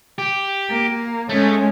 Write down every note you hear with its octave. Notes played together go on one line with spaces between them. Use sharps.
G4
A#3
G#3 A3 C#4